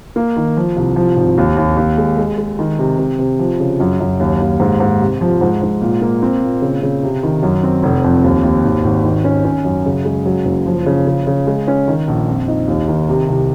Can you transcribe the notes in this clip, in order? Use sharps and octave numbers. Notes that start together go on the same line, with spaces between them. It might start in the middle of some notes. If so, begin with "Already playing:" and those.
A#3
D#3
F3
C2
F3
G#1
D#2
D#2
D#2
G#3
G#3
G#3
D#3
C3
C3
C3
F3
C#3
F#2
F#2
D#2
D#2
G#2
G#2
C3
F3
G#2
G#2
A#2
A#3
C4
A#2
C#3
C#3
C3
D#3
F#2
C4
F1
F2
D#2
D#2
G#1
G#1
D#3
C#4
C#4
F#2
C#3
G#3
F#3
F#1
F3
C#3
C#3
C#3
G#3
C#4
D#3
A#1
F2
D#4
D#2
D#3
C3
C2